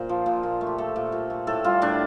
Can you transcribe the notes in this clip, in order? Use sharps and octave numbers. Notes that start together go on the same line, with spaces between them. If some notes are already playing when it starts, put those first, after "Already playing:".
Already playing: A#2 C5
F3
A#2
A#2
A3
G4
A3 A4
A#2
A#2
A3
A2 A4
G3 F4
A2 D4